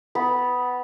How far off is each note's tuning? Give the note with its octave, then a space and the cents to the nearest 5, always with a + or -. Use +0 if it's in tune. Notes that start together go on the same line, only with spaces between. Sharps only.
B3 +15 B5 -10